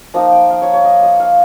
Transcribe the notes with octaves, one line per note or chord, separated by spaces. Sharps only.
F3 A#3 D#4 A#5
G5
F5
C#5
C#5
D#5
D#5
F5